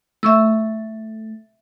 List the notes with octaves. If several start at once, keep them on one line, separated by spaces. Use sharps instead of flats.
A3 E5 C#6 E6